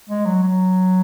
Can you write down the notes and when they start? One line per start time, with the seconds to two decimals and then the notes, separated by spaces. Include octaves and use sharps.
0.10 G#3
0.26 F#3
0.43 F#3